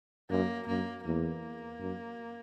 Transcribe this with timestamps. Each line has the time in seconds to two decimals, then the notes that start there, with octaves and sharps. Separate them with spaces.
0.30 F#2 A#3
0.67 F#2 A#3
1.05 E2 A#3
1.80 F#2